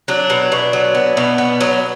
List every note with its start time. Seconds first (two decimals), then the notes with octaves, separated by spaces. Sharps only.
0.08 F#3 D4
0.30 B2
0.52 B2
0.73 F#3
0.95 B3
1.17 B2
1.38 B3
1.61 F#3